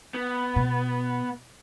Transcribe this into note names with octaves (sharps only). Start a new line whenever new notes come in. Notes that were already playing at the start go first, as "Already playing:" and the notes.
B3
B2